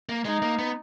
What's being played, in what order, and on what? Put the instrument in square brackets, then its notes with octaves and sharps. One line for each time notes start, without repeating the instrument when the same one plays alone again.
[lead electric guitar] A#3
[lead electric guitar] G#3 [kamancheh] D#4
[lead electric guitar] A#3
B3